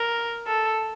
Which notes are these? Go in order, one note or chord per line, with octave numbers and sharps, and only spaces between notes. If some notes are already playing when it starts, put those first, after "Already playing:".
Already playing: A#4
A4